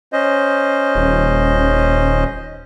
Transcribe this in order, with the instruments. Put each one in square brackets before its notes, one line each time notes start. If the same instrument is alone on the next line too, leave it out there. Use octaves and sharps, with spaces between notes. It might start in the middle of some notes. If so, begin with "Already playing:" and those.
[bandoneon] C#4 C5 D#5
[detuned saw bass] D#1